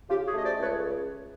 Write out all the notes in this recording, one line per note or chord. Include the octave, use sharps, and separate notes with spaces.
C#3 F4 G4
F#4 G#4
A3 D#5
C5 D5
C#2
B4 C#5